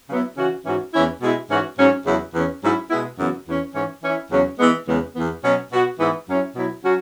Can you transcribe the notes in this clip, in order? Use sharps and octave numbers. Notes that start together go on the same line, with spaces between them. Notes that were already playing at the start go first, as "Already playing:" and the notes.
C#3 F#3 B3 E4
C#3 E3 C#4 F#4
G#2 E3 C#4 F#4
E2 E3 C#4 E4
B2 G#3 E4
G#2 E3 C#4 F#4
G#2 F#3 C#4
E2 C#3 F#3 E4
E2 E3 C#4
G#2 F#3 C#4 E4
B2 G#3 B3 E4
F#2 C#3 E3 B3 F#4
E2 E3 C#4
G#2 E3 C#4
E3 C#4 E4
E2 C#3 F#3 C#4
E3 G#3 B3
E2 C#3 E3 G#3 B3
E2 E3 B3
B2 F#3 C#4
B2 B3 F#4
G#2 E3 B3 E4
F#2 F#3 C#4 E4
B2 F#3 E4
F#3 C#4 F#4